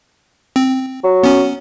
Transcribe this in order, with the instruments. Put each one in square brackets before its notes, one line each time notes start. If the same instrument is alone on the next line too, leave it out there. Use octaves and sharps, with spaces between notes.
[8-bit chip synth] C4
[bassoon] F#3
[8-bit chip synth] B3 C#4